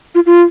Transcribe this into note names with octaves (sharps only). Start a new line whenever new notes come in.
F4
F4